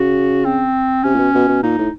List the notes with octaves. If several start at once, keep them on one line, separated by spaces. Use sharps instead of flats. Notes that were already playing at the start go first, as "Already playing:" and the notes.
Already playing: C#3 F#4
C4
C3 C#4
A#2
B2
B2
B2
A#2 D#4
A2